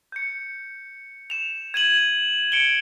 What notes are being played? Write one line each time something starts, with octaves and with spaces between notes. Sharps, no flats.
G6 C#7
E7 F7
G#6 D#7 E7 F#7
C#7 D7 E7 G7